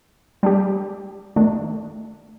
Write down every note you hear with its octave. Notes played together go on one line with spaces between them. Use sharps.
G3 D4 G4
D#3 A3 D4